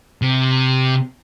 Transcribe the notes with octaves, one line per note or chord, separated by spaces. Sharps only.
C3